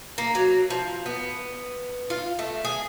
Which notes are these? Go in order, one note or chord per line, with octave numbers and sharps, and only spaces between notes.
A#3
F#3
F3
B3
F4
A3
G#4